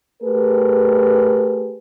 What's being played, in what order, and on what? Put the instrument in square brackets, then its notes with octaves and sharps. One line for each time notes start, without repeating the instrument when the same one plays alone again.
[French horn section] A3 G4 G#4 A#4 B4